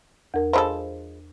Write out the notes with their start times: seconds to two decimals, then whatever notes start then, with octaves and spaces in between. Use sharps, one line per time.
0.34 E2 A#4
0.53 F3 G#3 A4 C5 B5